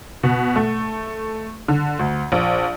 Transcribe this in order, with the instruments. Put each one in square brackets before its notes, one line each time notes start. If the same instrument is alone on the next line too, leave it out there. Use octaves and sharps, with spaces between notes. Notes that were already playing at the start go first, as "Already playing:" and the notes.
[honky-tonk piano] B2
A3
D3
D2
A#1